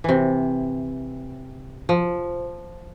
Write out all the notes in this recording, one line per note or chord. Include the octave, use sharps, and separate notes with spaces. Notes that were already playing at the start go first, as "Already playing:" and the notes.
C3 E3
F3